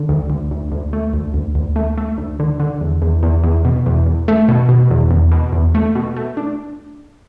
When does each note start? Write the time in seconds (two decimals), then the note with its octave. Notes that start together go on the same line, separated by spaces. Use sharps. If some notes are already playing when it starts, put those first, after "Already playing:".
Already playing: D3
0.09 D2
0.30 D2
0.51 D2
0.72 D2
0.93 A3
1.14 D2
1.34 D2
1.55 D2
1.76 A3
1.98 A3
2.18 D2
2.40 D3
2.60 D3
2.81 E2
3.02 E2
3.23 E2
3.44 E2
3.65 B2
3.86 E2
4.06 E2
4.28 A3
4.48 B2
4.69 B2
4.91 E2
5.11 E2
5.32 B2
5.53 E2
5.75 A3
5.95 B2
6.17 A3
6.37 D4